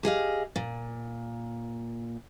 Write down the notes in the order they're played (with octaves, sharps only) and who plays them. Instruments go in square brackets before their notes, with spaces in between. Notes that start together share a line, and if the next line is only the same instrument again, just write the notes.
[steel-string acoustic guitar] G4 G#4 D#5 F5
A#2